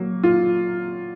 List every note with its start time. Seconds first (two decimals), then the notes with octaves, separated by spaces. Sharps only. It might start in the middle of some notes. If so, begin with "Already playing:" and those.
Already playing: F#3 A#3
0.23 F4